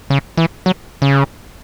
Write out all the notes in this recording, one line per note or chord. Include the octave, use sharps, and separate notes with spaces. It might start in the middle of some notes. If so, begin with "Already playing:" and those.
C#3
E3
F#3
C#3